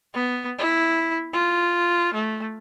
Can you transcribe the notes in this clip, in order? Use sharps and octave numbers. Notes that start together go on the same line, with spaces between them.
B3
E4
F4
A3